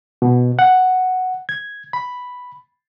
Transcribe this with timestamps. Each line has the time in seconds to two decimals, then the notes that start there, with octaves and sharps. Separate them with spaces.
0.22 B2
0.59 F#5
1.49 G#6
1.93 B5